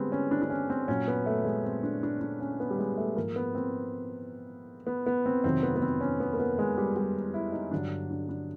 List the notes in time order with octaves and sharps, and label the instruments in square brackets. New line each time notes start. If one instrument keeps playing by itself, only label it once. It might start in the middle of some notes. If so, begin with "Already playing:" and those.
Already playing: [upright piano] D3 G3 G#3 B3 C4
C#4
D4
D4
C#4
C4
A#2 F#3 C#4
B3
A3
G#3
C4
D4
D4
D4
C#4
B3
G3
G#3
A3
G#2 F3 A#3
B3
C4
B3
B3
C4
F2 C3 D#3 F#3 C4
B3
B3
C4
C#4
B3
A#3
B3
G#3
G3
G3
E4
D#4
G2 D3 F#3 D4
D4
D4